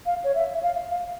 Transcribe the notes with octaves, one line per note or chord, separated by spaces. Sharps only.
F5
C#5
E5
E5
F5
F5